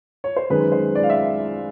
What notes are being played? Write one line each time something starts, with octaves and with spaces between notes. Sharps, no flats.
C#5
C5
F#2 D#3 G#3 B4
C5
D5
F5
E5